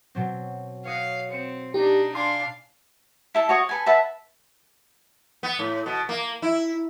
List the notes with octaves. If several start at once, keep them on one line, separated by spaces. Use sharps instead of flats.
B2 F#3 C4
C#5 D#5 F5 F#6
C4 C#7 D7 E7
D4 D#4 G4
D4 F5 G#5 B5 C6
E4 A4 A5
F#4 C#5 D#5
A4 B4 G#5
B4 E5 F#5 A5
B3
A2
B2
A#3
E4